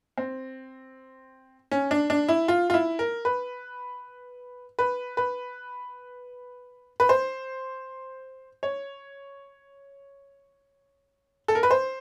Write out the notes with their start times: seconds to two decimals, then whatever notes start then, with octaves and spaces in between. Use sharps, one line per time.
0.18 C4
1.71 C#4
1.91 D4
2.10 D4
2.29 E4
2.48 F4
2.70 F4
2.74 E4
2.99 A#4
3.25 B4
4.79 B4
5.17 B4
7.00 B4
7.09 C5
8.63 C#5
11.48 A4
11.55 A#4
11.63 B4
11.71 C5